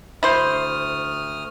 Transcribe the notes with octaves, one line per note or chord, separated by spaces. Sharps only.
D2 E4 C5 D#6 F6